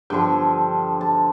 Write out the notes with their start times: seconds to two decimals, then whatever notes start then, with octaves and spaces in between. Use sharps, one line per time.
0.10 G2 D3 F3 G5
1.01 A5